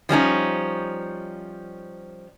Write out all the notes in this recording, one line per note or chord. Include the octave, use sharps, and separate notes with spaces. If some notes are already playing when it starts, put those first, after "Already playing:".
F3 G3 C#4 D#4